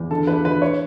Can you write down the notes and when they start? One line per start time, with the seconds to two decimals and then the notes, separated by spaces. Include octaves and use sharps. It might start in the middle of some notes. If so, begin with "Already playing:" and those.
Already playing: E2
0.10 D3 A4
0.27 E2 B4
0.45 D3 B4
0.62 E3 C#5